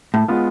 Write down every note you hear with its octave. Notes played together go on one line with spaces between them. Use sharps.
A2
G#3 B3 F4